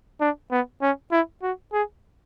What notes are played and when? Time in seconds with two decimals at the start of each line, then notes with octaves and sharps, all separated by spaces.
0.21 D4
0.51 B3
0.82 C#4
1.12 E4
1.43 F#4
1.73 G#4